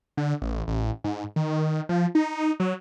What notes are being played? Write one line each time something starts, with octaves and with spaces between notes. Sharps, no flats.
D3
A1
A1
G#2
D#3
F3
D#4
F#3